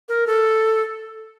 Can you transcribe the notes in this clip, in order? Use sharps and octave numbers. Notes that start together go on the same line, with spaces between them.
A#4
A4